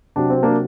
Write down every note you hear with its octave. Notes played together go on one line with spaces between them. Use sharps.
C3 F#3 D4
C4
A#3 D4